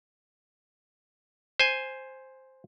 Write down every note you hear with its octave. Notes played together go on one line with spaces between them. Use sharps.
C5 G#5